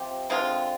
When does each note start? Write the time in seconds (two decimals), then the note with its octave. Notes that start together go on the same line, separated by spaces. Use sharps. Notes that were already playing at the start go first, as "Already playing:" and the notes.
Already playing: C3 F3 C4 G4
0.30 D3 G#3 C4 F4